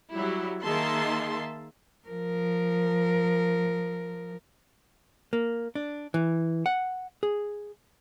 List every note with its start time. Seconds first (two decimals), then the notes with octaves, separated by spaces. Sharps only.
0.12 F#3 G3 E4
0.61 D#3 A#3 G#4 E5 A5 C6
2.08 F3 A#4
5.33 A#3
5.75 D4
6.14 E3
6.66 F#5
7.23 G#4